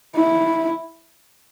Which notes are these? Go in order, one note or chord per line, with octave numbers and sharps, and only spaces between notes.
E4